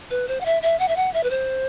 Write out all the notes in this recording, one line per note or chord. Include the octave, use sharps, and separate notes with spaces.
B4
C5
F#5
E5
E5
F#5
E5
F#5
E5
B4
C5